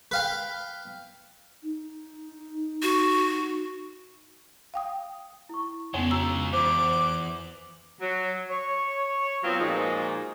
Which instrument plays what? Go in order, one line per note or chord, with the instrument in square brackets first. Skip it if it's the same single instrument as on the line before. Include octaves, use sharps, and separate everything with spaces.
[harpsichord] B4 F5 G5
[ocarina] D#4
[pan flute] F#4
[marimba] F5 G5 D#6
[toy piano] E4 C#6
[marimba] F2 B3 [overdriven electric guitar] C#3 G#3 [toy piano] C#5 G#5 C6
[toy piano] D4 F#4 A#5 [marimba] E6
[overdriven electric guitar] E2 [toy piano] F4 C5 [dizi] D6
[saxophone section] F#3
C#5
F#3 B3 C4 F4
A#2 F3 G#3 D#4 F#4